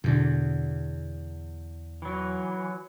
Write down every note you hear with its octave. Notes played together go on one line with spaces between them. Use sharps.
E2 B2 D3
E3 F#3